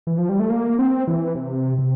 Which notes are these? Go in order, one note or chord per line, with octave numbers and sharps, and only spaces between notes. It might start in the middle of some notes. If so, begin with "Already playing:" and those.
E3
F3
G3
A3
A#3
C4
E3
C3
C3